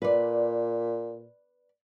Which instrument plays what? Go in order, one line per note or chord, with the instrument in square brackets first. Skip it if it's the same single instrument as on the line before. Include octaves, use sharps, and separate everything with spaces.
[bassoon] A#2 [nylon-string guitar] B4 D5